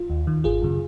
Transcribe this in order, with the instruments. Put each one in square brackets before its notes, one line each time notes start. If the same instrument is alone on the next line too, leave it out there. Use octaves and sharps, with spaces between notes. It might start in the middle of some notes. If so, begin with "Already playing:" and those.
Already playing: [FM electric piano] F4
D#2
D#3
G#1 F4 G#4
F#2 C#3